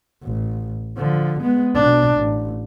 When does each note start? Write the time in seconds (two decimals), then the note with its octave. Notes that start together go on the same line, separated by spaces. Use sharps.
0.23 A1
0.97 D3 F3
1.40 G#3 B3
1.74 B2 D4
2.16 A1